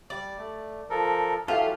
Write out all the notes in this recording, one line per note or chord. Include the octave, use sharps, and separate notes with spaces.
G3 D5
A3
F3 A4 A#4
E3 F#3 F4 G4 A4 E5 F5